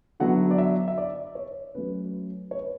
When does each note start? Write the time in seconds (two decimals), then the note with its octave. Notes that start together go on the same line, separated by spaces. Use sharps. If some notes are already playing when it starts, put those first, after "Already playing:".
0.20 D3 F#3 B3 E4 F#5
0.51 D5
0.58 E5
0.88 E5
0.98 D5
1.35 C#5
1.75 F#3 A3 C#4 B4
2.51 C#5
2.59 B4